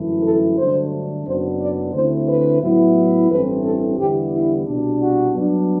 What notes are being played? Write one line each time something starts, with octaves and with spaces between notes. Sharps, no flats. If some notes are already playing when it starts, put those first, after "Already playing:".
Already playing: G1 F#2 E3 A3 E4
A4
G2 D3 F#3 A3 D4 C5
F#1 F#2 F#3 B3 D4 C5
D5
D2 D3 A3 C4 E4 C5
B4
A2 F#3 B3 E4
A1 G2 E3 A3 C4 B4
A4
E2 D3 G3 B3 E4 G4
E4
C2 B2 G3 D4
F#4
G2 F#3 B3 D4